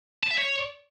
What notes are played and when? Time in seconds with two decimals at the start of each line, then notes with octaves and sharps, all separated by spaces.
0.23 A5
0.31 E5
0.38 C#5